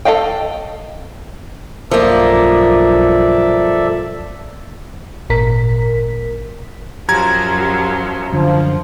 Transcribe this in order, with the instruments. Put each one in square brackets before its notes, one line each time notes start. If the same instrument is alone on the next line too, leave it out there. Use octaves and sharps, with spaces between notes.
[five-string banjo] A4 D#5 F5 G5
[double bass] B1 G2 [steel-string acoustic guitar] F3 A#3 [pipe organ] A4 D5 E5
[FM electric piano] G#1 A#2 A#4 B6
[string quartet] F#2 F3 F#3 [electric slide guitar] G4 [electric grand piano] A#5 G#6
[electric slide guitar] F#2 D3 [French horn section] F3